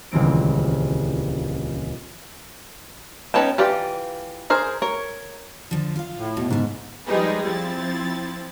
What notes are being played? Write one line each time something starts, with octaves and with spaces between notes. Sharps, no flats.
D#1 C#2 E3 C4 D7
B3 C#4 D#4 C#5 G5 A5
E3 F4 G4 D5
G#4 A#4 C5
A#4 C#5
D3 F3
F4 F5
A2
B2
G#2 C#3 A3
F3 G3 G#3 D#4 G#4 B4
F3 C4 E4 A6